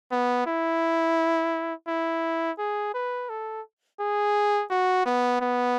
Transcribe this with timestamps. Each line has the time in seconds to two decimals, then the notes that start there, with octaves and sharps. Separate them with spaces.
0.11 B3
0.47 E4
1.88 E4
2.59 G#4
2.94 B4
3.29 A4
4.00 G#4
4.70 F#4
5.06 B3
5.41 B3